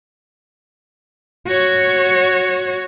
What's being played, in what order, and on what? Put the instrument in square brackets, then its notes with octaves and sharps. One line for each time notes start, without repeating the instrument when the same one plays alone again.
[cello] F#4 C#5